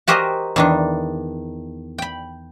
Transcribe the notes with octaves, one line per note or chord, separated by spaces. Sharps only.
F#4 G4 A#4 C5 D#5 G#5
E2 D#3 D4
G5 B5